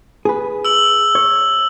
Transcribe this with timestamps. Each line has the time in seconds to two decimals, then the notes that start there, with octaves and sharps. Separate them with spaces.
0.25 G#4 B4
0.65 E6 F#7
1.15 C#5